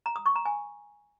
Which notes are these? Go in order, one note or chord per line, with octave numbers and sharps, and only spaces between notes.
A#5
D#6
C#6
A#5
G#5